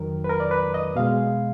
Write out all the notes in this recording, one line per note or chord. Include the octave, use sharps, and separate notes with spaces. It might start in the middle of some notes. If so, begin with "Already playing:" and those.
Already playing: F2 D#3 F#3 A#4
B4
A#4
D5
B4
D#5
B2 G#3 F5